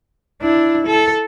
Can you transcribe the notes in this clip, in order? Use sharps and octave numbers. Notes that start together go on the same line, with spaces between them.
D4 E4
A4